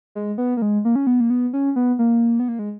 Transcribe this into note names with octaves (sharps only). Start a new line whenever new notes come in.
G#3
B3
A#3
G#3
A#3
C#4
B3
A#3
B3
C#4
B3
A#3
B3
A#3
G#3